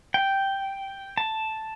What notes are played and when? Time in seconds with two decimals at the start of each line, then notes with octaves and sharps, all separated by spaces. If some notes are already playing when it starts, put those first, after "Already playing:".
0.14 G5
1.18 A5